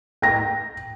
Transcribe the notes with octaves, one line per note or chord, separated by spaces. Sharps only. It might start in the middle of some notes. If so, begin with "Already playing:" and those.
G5 A#6